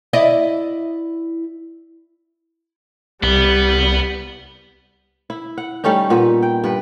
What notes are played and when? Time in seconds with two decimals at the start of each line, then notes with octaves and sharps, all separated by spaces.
0.13 E4 D5 D#5
3.23 C2 G3 B3
5.30 E4
5.58 F#5
5.84 G3 A3 C#4 D#4
6.10 A#2 B3
6.42 G5
6.64 G2 B4